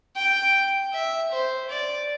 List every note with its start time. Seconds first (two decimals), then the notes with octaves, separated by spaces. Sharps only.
0.16 G5
0.93 E5
1.31 C5
1.69 D5